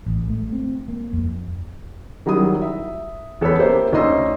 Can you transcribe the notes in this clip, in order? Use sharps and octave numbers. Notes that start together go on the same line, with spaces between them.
A1
A3
C4
A#3
F2
D#3 F#3 G3 E4 D#6
E5
E2 A4 B4 C#5 B6
A#3 G4 C5 E5
D2 C#4 D#4 D#5 C6 E6